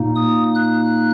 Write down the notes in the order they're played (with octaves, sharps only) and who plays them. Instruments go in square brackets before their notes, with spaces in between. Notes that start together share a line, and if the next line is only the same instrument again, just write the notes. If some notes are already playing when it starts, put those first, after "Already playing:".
Already playing: [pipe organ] A#2 A#3 D#4
D#6
F#6